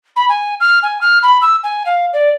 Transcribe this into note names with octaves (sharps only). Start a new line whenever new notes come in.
B5
G#5
F6
G#5
F6
B5
E6
G#5
F5
D5